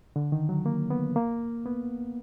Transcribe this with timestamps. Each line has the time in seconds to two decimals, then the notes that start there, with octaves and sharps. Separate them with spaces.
0.16 D3
0.32 D#3
0.49 F#3
0.66 A#3
0.90 B3
1.16 A#3
1.66 B3